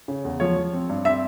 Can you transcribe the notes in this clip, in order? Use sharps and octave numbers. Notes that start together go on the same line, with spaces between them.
C#3
E2
F3 C#5
F3
C4
G2
C4 E5